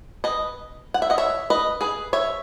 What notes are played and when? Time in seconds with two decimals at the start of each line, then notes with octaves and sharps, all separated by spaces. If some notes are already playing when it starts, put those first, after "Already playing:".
0.24 B4 D#5
0.94 F#5
1.02 E5
1.10 D#5 F#5
1.18 C#5 E5
1.50 B4 D#5
1.81 G#4 B4
2.13 C#5 E5